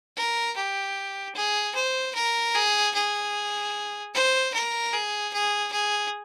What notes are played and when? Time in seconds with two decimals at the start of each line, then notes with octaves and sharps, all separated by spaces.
0.17 A#4
0.57 G4
1.35 G#4
1.75 C5
2.16 A#4
2.55 G#4
2.95 G#4
4.14 C5
4.54 A#4
4.93 G#4
5.33 G#4
5.73 G#4